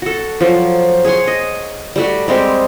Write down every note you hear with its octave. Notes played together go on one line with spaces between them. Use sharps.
F#4 A4
F3 F#3
G#4 C#5 F#5 C6
D#5
G3 A3 F#4
G3 G#3 C4 G4